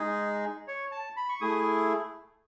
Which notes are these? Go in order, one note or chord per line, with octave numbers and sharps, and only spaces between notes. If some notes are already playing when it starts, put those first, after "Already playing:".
Already playing: G#3 D#4 G#4
C#5
A5
B5
C#6
A3 E4 G#4 D#6